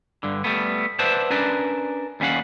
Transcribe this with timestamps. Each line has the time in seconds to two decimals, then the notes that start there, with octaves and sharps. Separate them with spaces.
0.23 G2 D3
0.44 G3 A3 B3
0.99 B4 C5 D5 E5 F#5 A5
1.30 C#4 D4 A#4 B4 D5
2.20 D#2 G3 C#4 F5 F#5